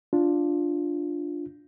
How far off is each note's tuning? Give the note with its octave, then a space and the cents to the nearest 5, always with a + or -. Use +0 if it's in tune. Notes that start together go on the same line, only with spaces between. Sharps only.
D4 +0 F4 +0